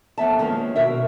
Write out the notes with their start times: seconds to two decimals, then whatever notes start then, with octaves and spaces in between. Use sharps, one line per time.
0.18 F2 B3 E5 A5
0.39 D#3 F3 G#3 A#3 B3 C#4
0.76 B2 F#4 A#4 E5